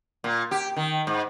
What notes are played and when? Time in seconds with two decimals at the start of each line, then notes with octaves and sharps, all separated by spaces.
0.24 A#2
0.51 G4
0.76 D#3
1.07 G#2